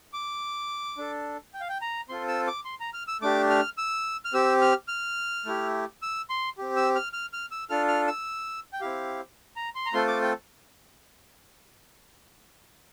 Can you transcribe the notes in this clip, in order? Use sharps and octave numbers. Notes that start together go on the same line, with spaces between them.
D6
D4 A4
G5
F5
G5
A#5
C4 F4 A4 C6
E6
D6
C6
A#5
F6
E6
A3 D4 G4 D6
F6
E6
F6
C4 G4 E6
F6
F6
A3 E4 G4
E6
C6
C4 G4
E6
F6
F6
F6
E6
D4 F4 A4 F6
F6
E6
G5
C4 E4 G4 F5
A#5
C6
A#5
A3 C4 F4 A4 C6
D6
G5